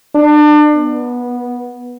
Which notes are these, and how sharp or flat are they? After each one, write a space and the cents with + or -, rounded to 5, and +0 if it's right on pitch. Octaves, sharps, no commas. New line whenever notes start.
D4 +30
B3 -15